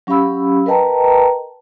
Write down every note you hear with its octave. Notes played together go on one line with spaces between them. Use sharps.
F#3 C#4 G4 F5 B5 E6
A#4 B4 D#5 G5 A5 A#5